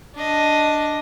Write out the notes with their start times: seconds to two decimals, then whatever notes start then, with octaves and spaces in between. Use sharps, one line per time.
0.15 D4 D#5